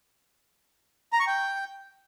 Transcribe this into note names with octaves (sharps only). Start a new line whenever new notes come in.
A#5
C#6
G5